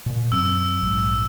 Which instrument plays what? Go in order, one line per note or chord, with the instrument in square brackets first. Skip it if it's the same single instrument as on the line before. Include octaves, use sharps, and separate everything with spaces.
[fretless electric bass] A#2
[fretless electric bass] F#2 F#3 C4 [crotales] E6
[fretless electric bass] A#1 G#2